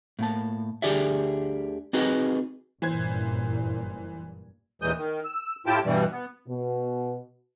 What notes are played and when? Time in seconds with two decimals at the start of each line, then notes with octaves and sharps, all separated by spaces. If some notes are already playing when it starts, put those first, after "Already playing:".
0.19 A2 A#3 A5
0.82 D2 D3 G4 G#4 D5 E5
1.93 C4 D#4 F#4 G#4 B4 D#5
2.82 F#1 G2 A#2 E3 C5 G#6
4.82 D#2 A#2 E3 G#3 D#6 G6
4.98 D#3
5.24 E6
5.66 A2 E4 F4 G4 G5 A5
5.85 G2 B2 E3 G3
6.12 B3
6.47 B2